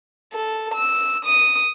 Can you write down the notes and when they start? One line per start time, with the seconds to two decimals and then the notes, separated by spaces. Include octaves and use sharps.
0.33 A4
0.74 E6
1.25 D#6